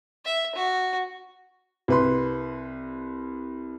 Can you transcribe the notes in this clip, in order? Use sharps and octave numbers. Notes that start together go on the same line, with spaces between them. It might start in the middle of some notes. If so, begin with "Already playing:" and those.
E5
F#4
C2 B4 C6